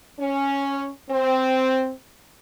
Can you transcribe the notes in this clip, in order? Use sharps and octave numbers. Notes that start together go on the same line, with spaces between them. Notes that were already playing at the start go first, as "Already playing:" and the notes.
C#4
C4